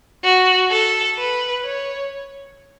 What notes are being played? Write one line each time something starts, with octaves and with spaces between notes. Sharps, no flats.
F#4
A4
B4
C#5